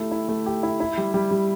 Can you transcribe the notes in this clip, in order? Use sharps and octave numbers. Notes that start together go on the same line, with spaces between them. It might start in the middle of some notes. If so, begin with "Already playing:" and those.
Already playing: A3 E4 G4
E4
A3
G4
E4
E4
G3
G3
G3